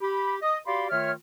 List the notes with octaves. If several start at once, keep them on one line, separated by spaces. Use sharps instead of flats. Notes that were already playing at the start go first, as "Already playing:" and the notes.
G4 B5
D#5 D#6
F#4 G4 D5 F5 B5 C6
D#3 A3 F4 C#5 E5 F6